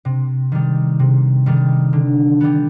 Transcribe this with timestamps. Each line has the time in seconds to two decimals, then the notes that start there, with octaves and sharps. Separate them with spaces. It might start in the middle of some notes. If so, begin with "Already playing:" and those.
0.05 C3
0.52 D#3 G3
0.99 C3
1.46 D#3 G3
1.93 D3
2.41 G3 B3